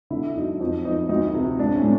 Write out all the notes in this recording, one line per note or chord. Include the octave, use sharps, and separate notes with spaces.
D3 E4
F#2 D#4
F2 D#4
F2 D#4
D2 D#4
C3
A2 D4
C#4
A2